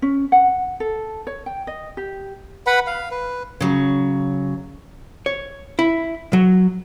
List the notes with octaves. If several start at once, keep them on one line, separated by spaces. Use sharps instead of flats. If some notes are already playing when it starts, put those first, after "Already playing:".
C#4
F#5
A4
C#5
G5
D#5
G4
B4 F#5 B5
F5
B4
C#3 F#3
C#5
E4
F#3